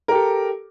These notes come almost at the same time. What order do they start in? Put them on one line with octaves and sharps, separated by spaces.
A#4 G4 A4